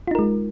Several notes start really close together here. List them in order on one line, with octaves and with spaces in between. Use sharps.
F4 D#4 A#4 G#3